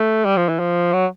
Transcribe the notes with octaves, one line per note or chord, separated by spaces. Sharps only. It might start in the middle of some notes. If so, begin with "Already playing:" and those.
Already playing: A3
G3
F3
E3
F3
F#3